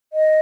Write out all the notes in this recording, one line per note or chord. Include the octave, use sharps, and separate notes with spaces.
D#5